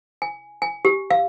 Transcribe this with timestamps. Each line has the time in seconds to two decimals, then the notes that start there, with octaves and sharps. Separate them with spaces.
0.22 G#5
0.62 G#5
0.85 G4
1.11 F5